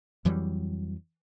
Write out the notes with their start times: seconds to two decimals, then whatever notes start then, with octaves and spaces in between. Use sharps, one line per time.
0.25 F2 E3 F#3 G3